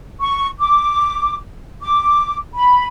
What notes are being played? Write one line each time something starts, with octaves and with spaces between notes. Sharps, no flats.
C#6
D6
D6
B5